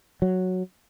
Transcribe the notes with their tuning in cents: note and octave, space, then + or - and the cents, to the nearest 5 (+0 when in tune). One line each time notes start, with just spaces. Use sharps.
F#3 -5